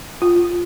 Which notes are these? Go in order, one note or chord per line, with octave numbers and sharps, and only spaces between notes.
F4